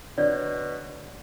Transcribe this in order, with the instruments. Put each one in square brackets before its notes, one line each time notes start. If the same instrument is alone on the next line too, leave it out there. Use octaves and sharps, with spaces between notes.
[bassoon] B2 [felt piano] D3 [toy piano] C#5 D5